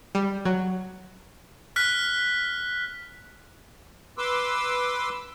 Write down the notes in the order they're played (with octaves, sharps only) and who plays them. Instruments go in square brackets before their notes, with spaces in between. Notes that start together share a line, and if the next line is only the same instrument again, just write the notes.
[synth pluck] G3
F#3
[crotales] F6 F#6 B6
[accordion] B4 C6 D6 E6